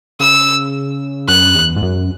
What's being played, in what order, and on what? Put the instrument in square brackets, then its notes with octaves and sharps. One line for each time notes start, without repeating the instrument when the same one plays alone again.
[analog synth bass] C#3 [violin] E6
[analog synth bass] F#2 [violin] F#6
[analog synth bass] E2
G#2
F#2